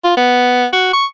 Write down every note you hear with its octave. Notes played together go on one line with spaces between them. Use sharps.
F4
B3
F#4
C#6